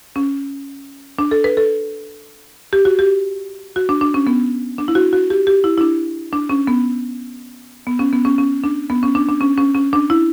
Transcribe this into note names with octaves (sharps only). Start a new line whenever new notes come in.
C#4
D4
A4
B4
A4
G4
F#4
G4
F#4
D4
D4
C#4
B3
D4
E4
F#4
F#4
G4
G4
E4
E4
D4
D4
C#4
B3
B3
C#4
B3
C#4
C#4
D4
B3
C#4
D4
D4
C#4
C#4
C#4
D4
E4